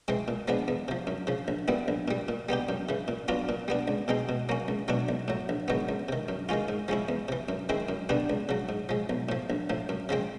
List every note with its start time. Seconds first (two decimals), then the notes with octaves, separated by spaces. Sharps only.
0.08 E3 G#3 C4
0.28 A#2
0.48 F3 G#3 B3 D4
0.68 E2
0.88 C3 F3
1.07 F#2
1.27 C#3 F3
1.48 A#1
1.68 A#2 G3 B3 E4
1.88 A#1
2.08 A#2 G3
2.28 A#2
2.49 G3 B3 D#4 G4
2.69 F#2
2.89 C#3 E3
3.08 A#2
3.28 F#3 B3 D4 F4
3.49 A#2
3.68 G3 B3 D4
3.88 C#2
4.08 B2 G#3 C4 D#4
4.29 B2
4.49 F#3 A#3 C#4
4.68 C#2
4.88 B2 F#3 A3 D4
5.09 B1
5.28 A2 F#3
5.49 A#1
5.68 G#2 D#3 F#3 B3
5.89 C#2
6.09 C3 D#3
6.28 F#2
6.49 D#3 G#3 C#4 F4
6.69 G#2
6.88 F3 G#3 C#4 E4
7.09 E2
7.28 C3 E3
7.49 F#2
7.69 D#3 G#3 C4 E4
7.89 F#2
8.09 D3 G3 B3 D4
8.30 C#2
8.49 C#3 F#3
8.69 G#2
8.89 F3 G#3
9.10 B1
9.29 A2 F3
9.50 A#1
9.70 A2 F3
9.89 F#2
10.09 C#3 F3 G#3 C4